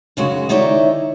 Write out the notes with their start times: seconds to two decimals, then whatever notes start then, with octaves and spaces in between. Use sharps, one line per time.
0.17 F#2 C#3 G#3 F#4
0.49 D#3 D#4 E4 C#5 D5 E5